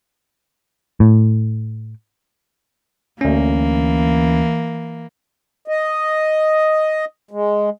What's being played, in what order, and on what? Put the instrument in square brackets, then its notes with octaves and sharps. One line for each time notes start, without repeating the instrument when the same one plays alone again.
[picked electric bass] A2
[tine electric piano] D2 C#4 [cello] E3 A#3
[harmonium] D#5
G#3